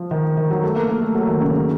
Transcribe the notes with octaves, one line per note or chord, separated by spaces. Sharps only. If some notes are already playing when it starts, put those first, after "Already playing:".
Already playing: F3
D#3
D#3
F#3
A3
A#3
A#3
A3
F#3
D#3
C#3
C#3